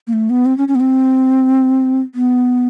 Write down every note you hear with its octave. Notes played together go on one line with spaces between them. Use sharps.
A#3
A3
B3
C4
C#4
C#4
B3
C4
B3